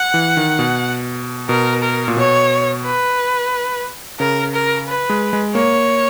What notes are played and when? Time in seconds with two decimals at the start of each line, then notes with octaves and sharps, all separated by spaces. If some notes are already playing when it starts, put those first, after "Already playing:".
Already playing: F#5
0.14 E3
0.37 D#3
0.59 B2
1.49 B2 A#4
1.82 A#4
2.08 A#2
2.17 B2 C#5
2.84 B4
4.20 C#3 A#4
4.54 A#4
4.88 B4
5.10 G#3
5.33 G#3
5.55 A#3 C#5